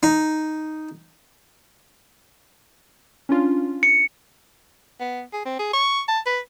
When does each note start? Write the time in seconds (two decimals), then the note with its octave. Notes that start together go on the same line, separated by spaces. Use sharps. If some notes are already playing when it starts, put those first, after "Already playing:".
0.03 D#4
3.29 C#4 D4 F4
3.83 C#7
5.00 B3
5.33 G#4
5.45 C4
5.59 G#4
5.73 C#6
6.08 A5
6.26 B4